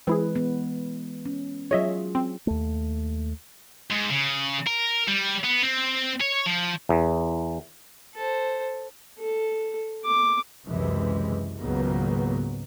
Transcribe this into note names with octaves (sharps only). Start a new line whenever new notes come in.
E3 G#3 C4 E4 G#4 B4
B3
C#4
F#3 F4 G#4 C#5 D#5 E5
C4
D#2 A3
G#2
C#3
A#4
G3
B3
C4
C#5
F3
E2
A4 C5
A4
D6
C#2 F#2 C3 E3 G#3
C#2 G#2 D#3 F#3 A#3 B3